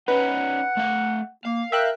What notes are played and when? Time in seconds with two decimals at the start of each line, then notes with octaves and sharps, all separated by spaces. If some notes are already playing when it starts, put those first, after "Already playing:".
0.08 C#4 D#4 B4 F#5
0.77 A3 F5
1.45 A#3 F5
1.72 A#4 E5 G5 F#6